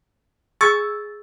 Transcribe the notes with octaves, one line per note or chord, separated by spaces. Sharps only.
G#4 C#6 E6 G#6 A6